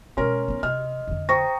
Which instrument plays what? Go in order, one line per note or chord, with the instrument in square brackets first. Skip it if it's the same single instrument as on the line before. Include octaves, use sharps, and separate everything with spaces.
[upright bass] B2 G#3 [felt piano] C#4 A#4 [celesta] C6
[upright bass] B3 D#4
[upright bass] C3 [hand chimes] D#5 [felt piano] F6
[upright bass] F2 D3
[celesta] C5 A#6 [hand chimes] G5 A#5 D#6 [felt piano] C#6